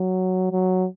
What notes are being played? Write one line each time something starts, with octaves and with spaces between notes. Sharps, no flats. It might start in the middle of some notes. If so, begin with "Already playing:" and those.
Already playing: F#3
F#3